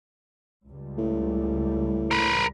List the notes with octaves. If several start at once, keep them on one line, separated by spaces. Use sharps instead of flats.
C#2 G3
A2
A#4 B4